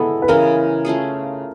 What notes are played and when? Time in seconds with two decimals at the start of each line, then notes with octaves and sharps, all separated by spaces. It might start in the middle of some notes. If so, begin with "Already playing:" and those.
Already playing: G#3 B3 D4 E4 A4
0.22 B4
0.28 C#3 E3 G#3 C#4 A#4
0.85 A3 C#4 F4 G#4